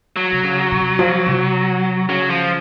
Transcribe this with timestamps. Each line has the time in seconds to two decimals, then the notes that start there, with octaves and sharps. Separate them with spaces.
0.16 F#3
0.32 C3
0.44 C#3
0.72 C3
0.99 F3
1.27 C3
2.09 C#3 F#3
2.30 F3